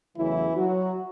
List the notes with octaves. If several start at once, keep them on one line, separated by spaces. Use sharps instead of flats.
E2 C#3 E3 F#3 A3 E4
F#3 F#4